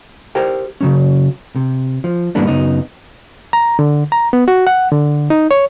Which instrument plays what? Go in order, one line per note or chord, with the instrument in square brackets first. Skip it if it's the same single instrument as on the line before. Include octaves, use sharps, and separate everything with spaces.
[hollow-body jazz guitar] G4 A#4 C5 G5
C#3 F#3 C#4
C3
F3
G#2 E3 G3 A#3 B3 D4
F#2 C#3 B3 D#4
[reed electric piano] A#5
D3
A#5
B3
F#4
F#5
D3
D#4
C#5